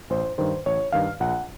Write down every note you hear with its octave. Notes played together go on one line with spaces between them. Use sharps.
A1 C5
G2 D#3 C5
A1 C#5
G2 D#3 F5
A#1 F#5